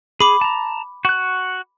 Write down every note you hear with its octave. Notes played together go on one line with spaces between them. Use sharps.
G#4 B5 D6
A5 A#5
F#4 F#6